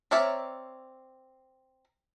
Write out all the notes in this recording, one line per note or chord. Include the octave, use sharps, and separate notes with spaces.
C4 A#4 C#5 D5 E5